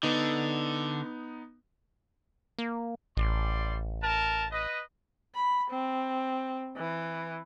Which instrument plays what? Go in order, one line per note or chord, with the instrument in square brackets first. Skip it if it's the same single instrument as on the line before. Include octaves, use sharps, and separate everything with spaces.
[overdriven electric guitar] D3 [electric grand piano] B3 D#4
[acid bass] A#3
[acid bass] A1 [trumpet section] G3 D5 C6
[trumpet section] A#4 A5
B4 D#5
[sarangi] B5
C4
E3